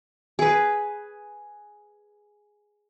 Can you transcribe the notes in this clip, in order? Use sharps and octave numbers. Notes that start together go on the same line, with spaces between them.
G#4 B4